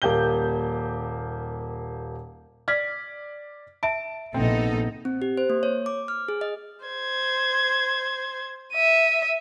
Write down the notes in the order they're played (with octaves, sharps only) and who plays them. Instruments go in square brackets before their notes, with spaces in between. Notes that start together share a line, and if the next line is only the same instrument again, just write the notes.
[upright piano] D#1 A#3 G4 G6 G7
[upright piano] D5 G#6 [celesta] F6 B6
[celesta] E5 D7 [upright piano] A5
[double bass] A#1 B3 [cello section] C3 D#4 A4 [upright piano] C4
[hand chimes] C4
G4
C5
A#3
C#5
D6
F6
G#4
D#5
[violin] C5 G#6
E5 D#7